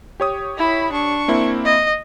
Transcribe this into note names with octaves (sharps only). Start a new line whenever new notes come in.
G4 C#5 D#6
E4 B5
D4 C#6
A#3 C4 E4
D#5